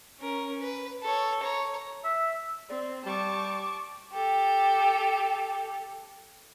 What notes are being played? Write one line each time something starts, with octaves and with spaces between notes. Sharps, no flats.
C#4 A#4
B4
A4 C#5
C#5 A#5
E5
C4 D5
G3 A5 C#6 D6
G4 A4